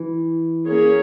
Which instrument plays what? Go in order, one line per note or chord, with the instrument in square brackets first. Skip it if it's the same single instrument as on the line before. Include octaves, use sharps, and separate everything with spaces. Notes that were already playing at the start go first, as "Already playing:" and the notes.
Already playing: [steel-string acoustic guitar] E3
[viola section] A#3 C#4 G#4 C#5